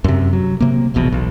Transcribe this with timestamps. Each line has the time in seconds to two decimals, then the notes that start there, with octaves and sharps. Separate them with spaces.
0.04 F#2 C3
0.33 F#3
0.60 C3 A#3
0.94 E1 A#1 E2 B2
1.12 B1